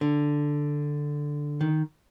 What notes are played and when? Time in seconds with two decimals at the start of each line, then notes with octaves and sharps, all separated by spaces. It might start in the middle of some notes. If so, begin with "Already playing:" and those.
0.01 D3
1.61 D#3